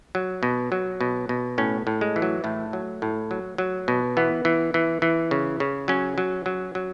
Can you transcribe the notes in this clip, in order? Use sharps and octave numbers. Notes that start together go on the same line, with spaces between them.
F#3
B2
F#3
B2
B2
A2 C#4
A2
G#3
E3
F#3
A2 A3
F#3
A2
F#3
F#3
B2
E3 B3
E3
E3
E3
C#3
C#3
F#3 C#4
F#3
F#3
F#3